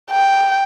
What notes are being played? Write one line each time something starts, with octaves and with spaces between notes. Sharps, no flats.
G5